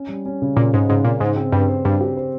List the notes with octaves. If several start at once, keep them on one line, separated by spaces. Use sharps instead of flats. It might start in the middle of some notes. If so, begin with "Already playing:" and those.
Already playing: C#4
G3
C#4
C#3
A#2 C#3
G#2 C#3
G#2 C#3
A#2 C#3
G#2 C5
C4
G2 C4
C5
G2 C5
G4
C5